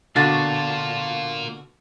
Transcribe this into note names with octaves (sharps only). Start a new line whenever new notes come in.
B2 D3 A#3 F4 F#4 F5 A5